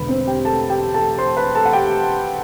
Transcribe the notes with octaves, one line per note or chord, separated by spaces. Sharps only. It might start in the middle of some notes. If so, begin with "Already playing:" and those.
Already playing: E1 E2 D3 B4 B5
C4 C5
G4 G5
A4 A5
G4 G5
A4 A5
C5 C6
B4 B5
A4 A5
F#5
G4 G5